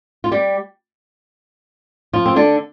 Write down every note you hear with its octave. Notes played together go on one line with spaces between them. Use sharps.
F4
G3 G4
F3 F4
C4
D3 D4